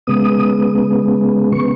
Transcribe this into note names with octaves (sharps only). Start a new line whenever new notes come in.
C#3 G#3 B3 D#6
C#3 B3 C#6